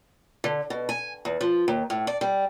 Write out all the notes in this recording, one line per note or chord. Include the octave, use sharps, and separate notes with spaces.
D3
B2
G#5
E2
F3
D#2
A2
D5
G3